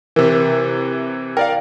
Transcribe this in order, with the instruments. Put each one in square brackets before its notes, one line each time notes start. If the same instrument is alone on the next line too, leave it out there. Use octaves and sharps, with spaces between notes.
[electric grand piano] C3 E3 [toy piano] A#4
[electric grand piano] A#4 D5 F5 [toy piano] G5